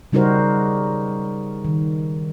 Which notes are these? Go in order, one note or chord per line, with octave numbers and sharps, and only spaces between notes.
C#3 G3 D#4 F#4 A#4 C5
D#3